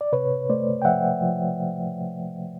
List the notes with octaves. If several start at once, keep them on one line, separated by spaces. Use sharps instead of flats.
D5
C3 B4 C#5
A3 C5 D5
G5
F3 E5 F#5
F3